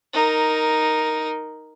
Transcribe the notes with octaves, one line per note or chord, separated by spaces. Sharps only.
D#4 A#4